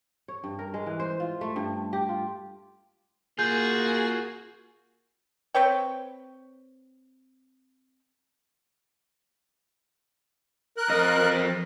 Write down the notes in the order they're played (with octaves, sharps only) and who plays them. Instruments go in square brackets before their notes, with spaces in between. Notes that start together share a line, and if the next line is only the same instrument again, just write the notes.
[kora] C#5
G2
A#4
G#3
E3
C5
F4
A3
G2
G4
F4
[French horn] A#3 [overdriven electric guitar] F4 F#4 [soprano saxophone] G#4 [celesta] G6
[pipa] C4 B4 C#5 G5
[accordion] A#4 F#6
[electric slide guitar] F2 D#5